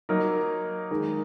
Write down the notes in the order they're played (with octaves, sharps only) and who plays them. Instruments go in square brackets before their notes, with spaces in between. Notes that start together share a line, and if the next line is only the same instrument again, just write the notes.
[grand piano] F#3 A#3 D#4 A#4
D#3 G#3 D#4 A#4